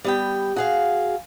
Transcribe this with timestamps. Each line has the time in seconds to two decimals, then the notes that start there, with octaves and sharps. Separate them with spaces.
0.04 G3 B3 G5
0.56 F#4 G#4 F5